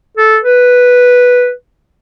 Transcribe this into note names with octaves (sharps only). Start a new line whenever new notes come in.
A4
B4